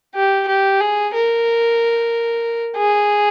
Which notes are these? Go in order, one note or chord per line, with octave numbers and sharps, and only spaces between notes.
G4
G4
G#4
A#4
G#4